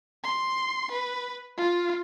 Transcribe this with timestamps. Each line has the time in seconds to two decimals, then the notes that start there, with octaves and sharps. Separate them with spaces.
0.24 C6
0.91 B4
1.57 F4